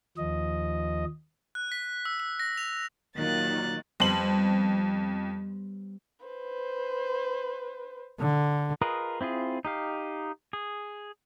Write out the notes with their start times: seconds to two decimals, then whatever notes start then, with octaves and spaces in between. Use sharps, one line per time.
0.17 D#2 F3 D#5
1.55 F#6
1.72 B6
2.05 E6
2.20 E6
2.40 A#6
2.58 F7
3.17 A#2 D#3 F#3 A#3 F#6 A6
4.00 F2 G3 B3 C5 F#7
6.26 B4 C5
8.20 D3
8.81 F4 G#4 A#4 B4 D#5
9.21 C4 E4 F4 G#4
9.65 D#4 G4 F5
10.53 G#4